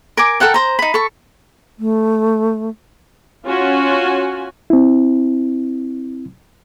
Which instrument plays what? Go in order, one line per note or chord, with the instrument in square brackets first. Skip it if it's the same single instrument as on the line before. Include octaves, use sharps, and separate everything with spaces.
[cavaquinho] A#4 G#5 D6
A4 A#4 F#5 G5
C5 A#5
D#4 B5
A4 C#6
[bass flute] A3
[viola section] C#4 F4 F#4 G#5
[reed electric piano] C4 E4